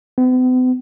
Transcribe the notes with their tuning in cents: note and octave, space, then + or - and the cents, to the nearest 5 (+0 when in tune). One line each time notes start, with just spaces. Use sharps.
B3 +45